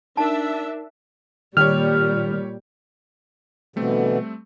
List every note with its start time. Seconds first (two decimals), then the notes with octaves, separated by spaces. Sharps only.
0.17 D4 D#4 A#4 E5 A5
1.57 A#2 D#3 G3 G4 C#5 F6
3.76 B2 D3 E3 G3 A3 C4